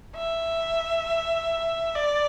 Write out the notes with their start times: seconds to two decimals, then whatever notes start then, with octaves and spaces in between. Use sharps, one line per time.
0.16 E5
1.95 D5